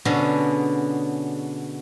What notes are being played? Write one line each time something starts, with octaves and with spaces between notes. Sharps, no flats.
B2 D3 C#4 G#4